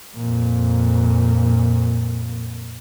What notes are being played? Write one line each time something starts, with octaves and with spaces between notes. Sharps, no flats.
F2 A#2